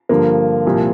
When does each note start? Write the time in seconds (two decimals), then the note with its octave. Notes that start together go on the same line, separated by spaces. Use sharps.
0.09 G2 D3 F3 A#3
0.65 C2 A#2 F3